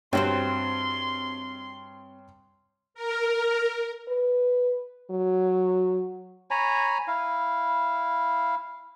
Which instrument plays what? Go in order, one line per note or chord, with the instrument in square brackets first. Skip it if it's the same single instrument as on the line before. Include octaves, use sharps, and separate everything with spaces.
[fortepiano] G2 [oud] C4 F#4 C5 [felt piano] C#5 G5 [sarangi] C6
[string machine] A#4
[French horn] B4
F#3
[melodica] C#5 G#5 A#5 B5
E4 F5